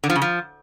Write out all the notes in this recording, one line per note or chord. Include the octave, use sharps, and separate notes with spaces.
D3
F3
C#3
F3